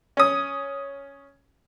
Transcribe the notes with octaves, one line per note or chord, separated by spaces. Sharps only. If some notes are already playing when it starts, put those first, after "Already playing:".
C#4 D#6